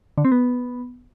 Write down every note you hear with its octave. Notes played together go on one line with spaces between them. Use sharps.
D3
C4
B3